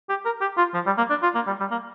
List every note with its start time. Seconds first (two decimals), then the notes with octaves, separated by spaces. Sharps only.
0.09 G4
0.25 A#4
0.41 G4
0.58 F4
0.74 F3
0.86 G3
0.98 A#3
1.10 D4
1.23 F4
1.35 A#3
1.47 G3
1.60 G3
1.71 A#3